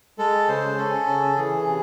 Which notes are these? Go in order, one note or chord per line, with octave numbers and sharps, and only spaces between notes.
G#3 A4
C#3 C5
C#4 A4
C#3
E3 G#4
C3